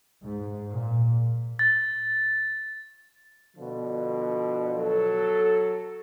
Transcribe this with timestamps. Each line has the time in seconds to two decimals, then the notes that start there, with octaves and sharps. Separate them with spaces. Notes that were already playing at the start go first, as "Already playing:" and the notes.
0.24 G#2
0.71 A#2
1.59 A6
3.56 B2 D3 F3
4.76 F#3 A4